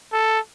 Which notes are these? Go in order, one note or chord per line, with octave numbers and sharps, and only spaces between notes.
A4